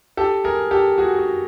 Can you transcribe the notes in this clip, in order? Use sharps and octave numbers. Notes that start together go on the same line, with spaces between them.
G4 A4
G#4 A#4
G4 A4
F#4 G#4
F#4 G#4